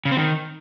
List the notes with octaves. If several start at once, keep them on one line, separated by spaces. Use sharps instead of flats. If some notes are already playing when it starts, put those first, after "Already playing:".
C#3
C4
D#3